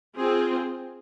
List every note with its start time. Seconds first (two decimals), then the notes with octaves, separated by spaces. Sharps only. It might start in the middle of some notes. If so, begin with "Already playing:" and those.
0.16 C4 F4 G#4